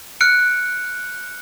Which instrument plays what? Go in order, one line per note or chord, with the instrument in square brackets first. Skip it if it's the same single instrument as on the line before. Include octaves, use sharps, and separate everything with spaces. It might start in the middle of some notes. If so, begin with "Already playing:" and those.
[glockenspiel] F6 F#6 C#7 D7